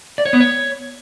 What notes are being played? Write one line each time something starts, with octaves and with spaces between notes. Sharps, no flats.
D5
C#5
B3
C#5